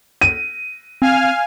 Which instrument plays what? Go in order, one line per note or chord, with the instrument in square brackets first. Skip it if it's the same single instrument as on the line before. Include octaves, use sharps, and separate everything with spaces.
[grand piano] D#7
[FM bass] C4 [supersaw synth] F5 G#5 F6